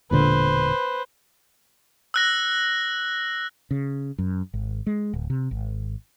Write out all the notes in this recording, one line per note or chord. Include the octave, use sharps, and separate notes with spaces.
E1 A#2 D3 B4 C5
E6 F#6 A#6
C#3
F#2
G#1
G#3
D1
C3
G#1